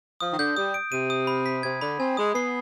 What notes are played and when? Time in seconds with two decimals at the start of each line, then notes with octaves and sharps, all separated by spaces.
0.21 F3 D#6
0.32 D#3
0.38 D3 G6
0.57 G3 D#6
0.74 D7
0.92 C3 D#7
1.10 D#6
1.27 B5
1.46 B6
1.63 C3 G#6
1.81 D3 B5
1.99 C4 G#5
2.17 G#3 D#6
2.35 B3 C7